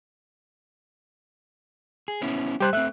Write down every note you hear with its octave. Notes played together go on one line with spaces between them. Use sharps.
G#4
B3 C#4 E4
G3 G4 C5 F#6
A3 C4 E5 F#6